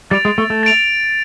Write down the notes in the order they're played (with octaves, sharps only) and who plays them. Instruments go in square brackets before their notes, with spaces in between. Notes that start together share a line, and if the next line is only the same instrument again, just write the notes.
[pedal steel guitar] G3 [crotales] A6 D7 F7
[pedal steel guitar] G#3
A3
A3
[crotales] A6 D7 F7